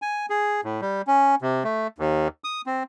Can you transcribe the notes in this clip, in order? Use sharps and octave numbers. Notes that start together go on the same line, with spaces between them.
G#5
G#4
A2
G3
C#4
C3
A3
D#2
D#6
C4